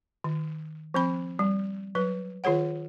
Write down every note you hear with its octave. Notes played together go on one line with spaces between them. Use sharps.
D#3
F3 C4 B5
G3
F#3 B4
D#3 F4 G#4 C#5 F#5